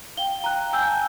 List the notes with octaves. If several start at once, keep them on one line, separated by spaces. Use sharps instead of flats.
F5 G5 G7
A#5 F#6
G#5 E6 G6
A5